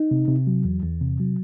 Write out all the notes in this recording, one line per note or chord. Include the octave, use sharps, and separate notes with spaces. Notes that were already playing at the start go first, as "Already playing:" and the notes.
Already playing: D#4
C3
C3
F#3
E2
E2
C3
F#3